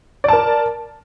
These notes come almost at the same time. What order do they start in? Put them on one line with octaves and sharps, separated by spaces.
D5 A5 A#4